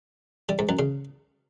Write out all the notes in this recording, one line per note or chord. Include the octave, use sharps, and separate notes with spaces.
G3
G#2
F#2
C#3